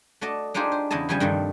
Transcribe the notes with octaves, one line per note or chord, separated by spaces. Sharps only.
A3 F#4 D5 D#5 A5
D4 D#4 F4 G4 G#4 C5
C5
E2 C#3 E4 D#5 A5
C#3 E3 F3 G3 G#5 A5
G2 C3 D#3 F3 A3